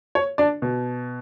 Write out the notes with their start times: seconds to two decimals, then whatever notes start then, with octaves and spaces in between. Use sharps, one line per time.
0.15 C#5
0.38 D4 D5
0.62 B2